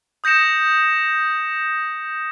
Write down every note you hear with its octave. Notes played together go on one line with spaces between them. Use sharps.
D#6 G6 A#6 C#7 E7